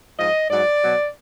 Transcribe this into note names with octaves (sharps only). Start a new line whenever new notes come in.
G#2 F3 D#5
G#2 F#3 D5
B2 F#3